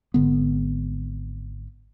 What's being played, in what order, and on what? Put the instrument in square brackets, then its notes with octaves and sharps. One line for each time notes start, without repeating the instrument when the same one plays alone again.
[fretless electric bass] G#1 D3 B3